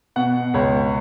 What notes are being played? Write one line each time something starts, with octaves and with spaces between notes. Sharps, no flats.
B2 F#5
C#2 C#5